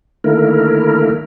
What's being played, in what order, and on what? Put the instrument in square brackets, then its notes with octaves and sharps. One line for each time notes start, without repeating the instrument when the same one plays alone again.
[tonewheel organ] D3 D#3 A3 A#3 E4 A#4